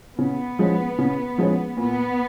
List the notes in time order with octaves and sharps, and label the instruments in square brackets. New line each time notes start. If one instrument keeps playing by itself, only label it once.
[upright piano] C#3 [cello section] B3
[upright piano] F3 G#3 C#4
C#3
F3 G#3 C#4
[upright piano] A#2 [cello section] B3